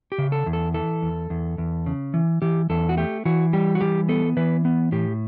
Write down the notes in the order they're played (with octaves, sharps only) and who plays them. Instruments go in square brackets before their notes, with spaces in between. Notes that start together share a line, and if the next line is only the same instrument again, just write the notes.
[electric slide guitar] G4
C#3
A4
E2
A4
E3 A4
E2
E2
E2
C#3
E3
E3 G4
E2 A4
F#4
A3 G4
E3 F#4
G3 G4
F#4
E3 G4
B3 A4
E3 B4
B3
A2 G4